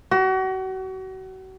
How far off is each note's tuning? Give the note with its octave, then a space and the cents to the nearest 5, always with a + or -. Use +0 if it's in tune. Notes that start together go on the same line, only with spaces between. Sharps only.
F#4 +35